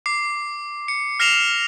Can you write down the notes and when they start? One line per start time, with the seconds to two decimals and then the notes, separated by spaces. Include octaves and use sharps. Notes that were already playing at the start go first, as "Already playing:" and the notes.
0.06 D6 C7
0.88 C#7
1.20 F6 A#6 C7 E7 F7 G7